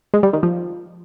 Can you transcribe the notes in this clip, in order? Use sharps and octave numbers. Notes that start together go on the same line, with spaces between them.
G#3
G3
D#3
F3